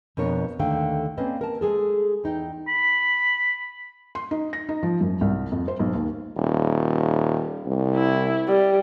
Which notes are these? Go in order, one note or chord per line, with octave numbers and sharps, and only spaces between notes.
F2 B2 B3 D4 A#4 C#5
D#2 D3 D#3 A3 F5 G5
A#3 C4 C#4 B4 D5 D#5
A#4 A5
G#3 G#4 A4
E2 D#4 G5
B5
C6
D#4
A#6
D#4
F3
F#2
C2
F2
C5
B1
D#2
D#1
C2
E4
G3